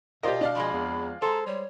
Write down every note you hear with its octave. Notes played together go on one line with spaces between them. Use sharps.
B2 F4 G4 A#4 C5 D5 D#5
D4 D5 D#5 F5
F2 F3 G#3 B5
E2
G#3 A4 C5 A#5
G3 C#5